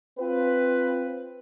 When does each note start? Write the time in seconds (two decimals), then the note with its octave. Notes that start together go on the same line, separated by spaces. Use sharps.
0.18 C4 F4 B4